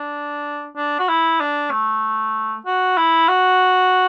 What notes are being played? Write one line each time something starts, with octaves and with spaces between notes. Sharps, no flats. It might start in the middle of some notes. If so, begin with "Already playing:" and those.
Already playing: D4
D4
F#4
E4
D4
A3
F#4
E4
F#4